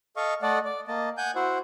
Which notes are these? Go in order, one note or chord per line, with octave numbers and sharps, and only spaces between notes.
A4 D#5 F5 C#6
A3 A4 D5 D#5 F#5 A5
D5
A#3 D#5 A5
F#5 G#5 G6
E4 F#4 C5 F#5